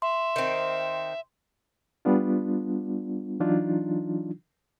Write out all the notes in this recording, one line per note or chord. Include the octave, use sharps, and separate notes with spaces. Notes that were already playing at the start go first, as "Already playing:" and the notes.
E5 C6
D#3 C4
G3 B3 D4 F4
E3 F#3 D4 D#4 F4